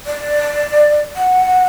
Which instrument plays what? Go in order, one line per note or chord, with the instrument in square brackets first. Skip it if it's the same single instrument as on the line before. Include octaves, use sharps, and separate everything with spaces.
[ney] D5
F#5